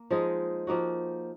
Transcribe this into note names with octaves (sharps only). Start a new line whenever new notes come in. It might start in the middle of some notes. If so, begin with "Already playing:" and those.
Already playing: A#3
F3 G#3 D#4 G#4
F3 A#3 D#4 F#4